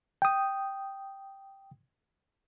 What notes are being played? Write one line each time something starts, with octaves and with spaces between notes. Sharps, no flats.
G5 D#6